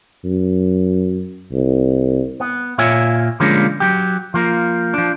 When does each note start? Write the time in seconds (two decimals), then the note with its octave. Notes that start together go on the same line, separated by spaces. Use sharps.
0.25 F#2
1.52 C2
2.40 B3
2.78 A#2 F4 C#5 E5 G#5
3.40 D3 F3 G3 G#3 A#3 C#4
3.80 F#3 G4
4.34 F3 A#3
4.94 F3 D4